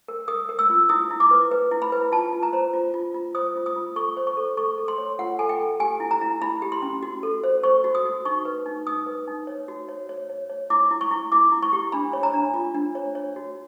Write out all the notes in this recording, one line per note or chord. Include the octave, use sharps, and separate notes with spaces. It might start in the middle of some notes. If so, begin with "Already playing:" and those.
A#4
A#4 D#6
A#4
E6
F4
E4 D#6
E4
D6
B4
B4
E4
B5
B4
F4 A5
F4
A#5
C5
F4
F4
F4
C5 D#6
F4
D#6
F4
A4 C#6
C5
C#6
A4
A4 C#6
A4
C6
C#5
F4 F#5
A4 G#5
G5
A4
G4 G#5
E4
A#5
E4
E4 B5
G4
C6
C#4
F#4
A4
C5
C5 C#6
F#4
D#6
F#4
D#4 C#6
B4
D#4
D#4 D#6
B4
D#4
C#5
F#4
C#5
C#5
C#5
C#5
E4 D6
E4
C#6
E4
E4 D6
E4
C#6
G4
D4 B5
C#5
A#5
D4
F4
D4
C#5
C#5
F#4